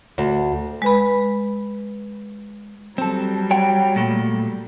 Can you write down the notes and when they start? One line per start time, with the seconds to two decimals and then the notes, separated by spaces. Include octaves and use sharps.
0.18 D2
0.82 G#3 B4 B5
2.98 F#3 G3 C4 A4
3.51 C#5 F#5 G5
3.96 A#2 A3